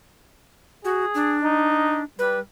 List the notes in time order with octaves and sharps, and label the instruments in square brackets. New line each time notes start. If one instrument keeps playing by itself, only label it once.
[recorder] F#4 [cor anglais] G#4
[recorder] D4
[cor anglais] D#4
[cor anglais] G3 [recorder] B4